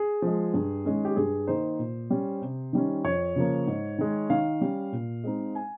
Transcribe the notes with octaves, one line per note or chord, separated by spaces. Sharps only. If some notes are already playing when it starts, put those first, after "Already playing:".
Already playing: G#4
F3 G#3
G2
D#3 G#3 C#4
G4
G2 G#4
D#3 A#3 D#4 C5
A#2
G3 C#4
C3
D#3 G3 C#4
F2 C#5
C#3 F3 A#3
G#2
D#3 G#3
D#3 F5
G3 C#4
A#2
G#3 C4 D#4
G#5